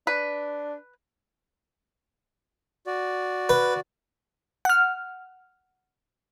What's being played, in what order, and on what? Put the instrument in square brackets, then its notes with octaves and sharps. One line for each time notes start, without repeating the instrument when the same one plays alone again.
[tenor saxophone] D4 [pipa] B4
[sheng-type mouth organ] F#4 D5
[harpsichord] B4
[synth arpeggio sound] F#5 F6